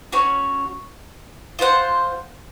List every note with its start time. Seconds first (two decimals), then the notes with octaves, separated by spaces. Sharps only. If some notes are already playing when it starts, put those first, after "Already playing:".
0.12 C#4 F#4 C#5
1.59 F4 C5 F#5